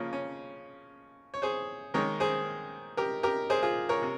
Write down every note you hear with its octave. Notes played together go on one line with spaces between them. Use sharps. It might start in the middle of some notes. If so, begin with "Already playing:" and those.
Already playing: C#3 F3 A#3 C#4
C#4
C#5
G#4 C5
D#3 G#3 A#4 C#5
G#4 C5
G4 A#4
G4 A#4
G#4 C5
F4 G#4
A#4 C#5
C3